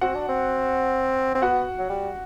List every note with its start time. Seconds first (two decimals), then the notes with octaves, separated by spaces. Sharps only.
0.01 C4 F#4 F#5
0.15 D4
0.29 C4
1.35 C4
1.42 B3 F#4 F#5
1.78 F#3
1.90 G3